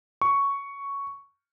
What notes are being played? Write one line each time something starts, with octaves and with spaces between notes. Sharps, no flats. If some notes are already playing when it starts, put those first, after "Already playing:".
C#6